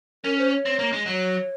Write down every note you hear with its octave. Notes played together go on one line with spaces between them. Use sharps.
C#4 A#4
C5
C#5
C4
A#3
G#3
F#3 C#5